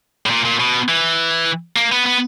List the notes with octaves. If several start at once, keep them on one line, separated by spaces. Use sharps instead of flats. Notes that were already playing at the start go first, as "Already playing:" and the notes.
A2
A#2
A#2
B2
E3
A#3
B3
B3